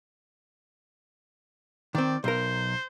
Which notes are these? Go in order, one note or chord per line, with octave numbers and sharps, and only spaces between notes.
D#3 C4 D5
B1 A#4 C5